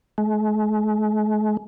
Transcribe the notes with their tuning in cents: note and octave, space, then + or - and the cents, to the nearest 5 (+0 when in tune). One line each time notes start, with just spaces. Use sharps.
G#3 +45